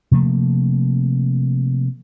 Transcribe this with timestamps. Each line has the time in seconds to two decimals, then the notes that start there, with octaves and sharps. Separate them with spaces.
0.11 C3 F3 A3 A#3